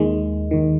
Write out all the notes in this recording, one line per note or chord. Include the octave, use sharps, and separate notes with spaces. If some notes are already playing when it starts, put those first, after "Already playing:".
Already playing: D#2 D#3 G#3
D#2 D#3